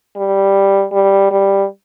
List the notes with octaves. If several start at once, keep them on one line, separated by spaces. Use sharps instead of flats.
G3
G3
G3